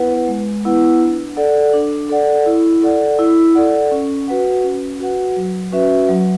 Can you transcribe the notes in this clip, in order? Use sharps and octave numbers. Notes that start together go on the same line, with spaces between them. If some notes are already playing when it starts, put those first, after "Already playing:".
Already playing: B3 E4 B4 F#5
G#3
B3 E4 B4 F#5
D4
A4 D5 F#5
D4
A4 D5 F#5
E4
A4 D5 F#5
E4
A4 D5 F#5
C#4
F#4 B4 F#5
C#4
F#4 B4 F#5
F#3
C#4 F#4 B4 E5
F#3